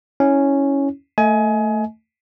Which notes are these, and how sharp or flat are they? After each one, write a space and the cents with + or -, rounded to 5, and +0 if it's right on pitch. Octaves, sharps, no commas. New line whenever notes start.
C#4 +0 E4 -25 C#5 +0
A3 +10 D#5 +35 G#5 +25